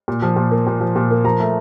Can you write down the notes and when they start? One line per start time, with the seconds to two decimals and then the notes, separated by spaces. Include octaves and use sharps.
0.08 A#2
0.22 F3
0.36 A#2
0.51 A#3
0.67 A#2
0.81 F3
0.96 A#2
1.11 A#3
1.24 F3 A#5
1.40 A3